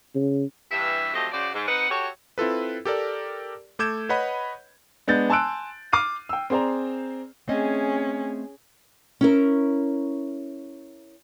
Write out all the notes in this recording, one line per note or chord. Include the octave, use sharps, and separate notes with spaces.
C#3
G2 E3 E5
F3 F#3 A3 C4 G4 D#5
C#3 F#4 C5 D5
G#2
C4 D#4 B4 F#5
F#4 G4 A4 C#5
C4 E4 F4 A4 B4
G4 A4 A#4 D5
A3 A4 D6 G6 G#6 E7
B4 C#5 D#5 F#5 B5
G#3 B3 D4 G6 A6
G#5 A5 C6 E6 F#6 D7
D6 F6 C7 D#7
G5 E6
C4 G#4 C5 D5 A#5
A3 C4 C#4 G#4 D#5
C#4 E4 A#4